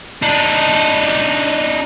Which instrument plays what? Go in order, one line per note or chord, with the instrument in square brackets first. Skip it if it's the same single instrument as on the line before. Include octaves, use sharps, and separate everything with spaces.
[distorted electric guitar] D4 D#4